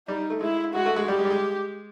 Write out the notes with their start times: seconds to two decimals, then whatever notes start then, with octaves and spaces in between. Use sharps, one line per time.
0.08 G3 D#4
0.30 A3
0.41 G#3 E4
0.74 G#3 F#4
0.86 A3
0.96 G#3
1.07 G3 G4
1.19 G#3
1.25 G3
1.30 G#3